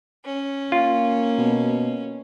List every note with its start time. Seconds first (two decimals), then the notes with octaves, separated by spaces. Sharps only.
0.25 C#4
0.72 A#3 F4
1.38 B2